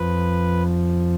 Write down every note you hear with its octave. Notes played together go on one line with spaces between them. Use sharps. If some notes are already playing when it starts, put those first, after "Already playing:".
Already playing: F2 F3 B4